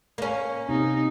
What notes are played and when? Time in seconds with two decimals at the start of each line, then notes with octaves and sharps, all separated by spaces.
0.18 A#3 C#4
0.69 C3 D#4